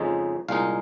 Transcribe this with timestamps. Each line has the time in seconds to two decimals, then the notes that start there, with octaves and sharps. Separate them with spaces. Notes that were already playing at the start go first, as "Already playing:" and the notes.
Already playing: F2 C#3 G#3 D#4
0.48 C2 A#2 G#3 D#4 F5